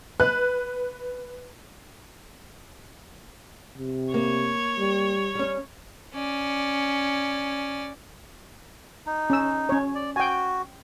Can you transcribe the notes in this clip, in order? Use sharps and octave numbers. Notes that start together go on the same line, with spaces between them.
B4 F#6
C3
A#3 C#5
G3
G3 C#4
C#4 D5
D#4
C#4 E6
C#4 C#5
D5
F#4 G5 G#5